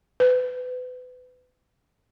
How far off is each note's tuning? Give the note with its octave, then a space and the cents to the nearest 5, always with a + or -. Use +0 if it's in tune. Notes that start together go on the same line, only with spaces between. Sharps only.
B4 +30